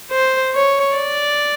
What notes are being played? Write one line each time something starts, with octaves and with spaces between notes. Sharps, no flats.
C5
C#5
D5